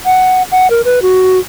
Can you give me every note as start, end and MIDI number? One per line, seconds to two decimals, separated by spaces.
0.05 0.43 78
0.52 0.67 78
0.70 0.82 70
0.85 1.00 71
1.02 1.39 66